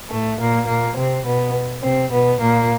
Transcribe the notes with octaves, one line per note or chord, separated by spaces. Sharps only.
A2 A3
A#2 A#3
A#2 A#3
C3 C4
B2 B3
C3 C4
B2 B3
A#2 A#3